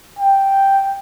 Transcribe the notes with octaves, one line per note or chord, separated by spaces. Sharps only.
G5